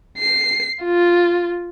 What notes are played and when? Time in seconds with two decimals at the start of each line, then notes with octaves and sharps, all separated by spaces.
0.19 C7
0.83 F4